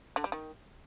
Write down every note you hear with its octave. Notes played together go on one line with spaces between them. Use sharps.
D3
G3
D#3